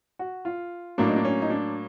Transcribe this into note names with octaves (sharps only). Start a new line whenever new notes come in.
F#4
F4
A2 F#3 A#3 D4
D#4
D4
C#4
D#4
D4